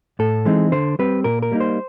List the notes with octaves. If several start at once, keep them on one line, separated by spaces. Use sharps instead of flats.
A2 A4
E3 G#3 C4 D#4
D3 C5
G3 C4 B4
A#2 A#4
A#4
G3 A#3 D#4
C5